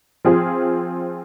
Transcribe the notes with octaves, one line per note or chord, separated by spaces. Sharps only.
F3 C4 F4 G#4